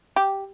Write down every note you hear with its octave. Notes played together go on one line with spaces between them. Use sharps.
G4